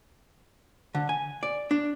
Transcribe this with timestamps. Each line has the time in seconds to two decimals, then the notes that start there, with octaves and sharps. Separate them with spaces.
0.95 D3
1.09 G#5
1.43 D5
1.71 D4